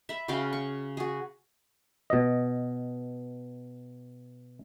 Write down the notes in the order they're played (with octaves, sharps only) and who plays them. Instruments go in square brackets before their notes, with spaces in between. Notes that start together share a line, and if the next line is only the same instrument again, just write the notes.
[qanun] E5 B5
C#3 F#4 F5 G5
C#6
F#4 G#4
[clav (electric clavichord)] B2 D#5